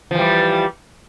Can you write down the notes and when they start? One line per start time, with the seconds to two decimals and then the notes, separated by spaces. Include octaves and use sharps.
0.11 F3
0.15 E3
0.19 G3